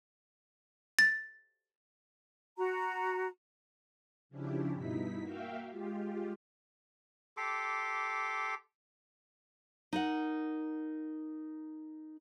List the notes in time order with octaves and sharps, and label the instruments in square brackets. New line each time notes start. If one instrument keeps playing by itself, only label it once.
[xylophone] A6
[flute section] F#4 A#5
[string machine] C#3 F3 C#4 D4 E4 G4
G2 B2 D#4 E4 B6
A#3 F#4 E5 F5 G5
G#3 F4 G4
[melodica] G4 A4 C6 D6
[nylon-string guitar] D#4 A#4 F#5